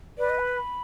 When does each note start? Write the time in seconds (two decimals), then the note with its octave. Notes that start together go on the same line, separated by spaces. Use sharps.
0.18 B4 D5
0.30 D#5
0.40 B5